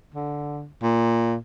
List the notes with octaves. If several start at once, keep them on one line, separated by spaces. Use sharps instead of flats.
D3
A#2